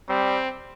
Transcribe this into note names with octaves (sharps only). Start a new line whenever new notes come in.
G3 C4